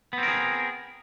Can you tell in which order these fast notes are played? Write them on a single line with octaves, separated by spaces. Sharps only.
B3 C4 A#4 G#4